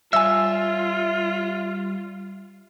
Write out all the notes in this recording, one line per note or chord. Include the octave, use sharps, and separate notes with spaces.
G3 F4 C#5 E5 G#5 E6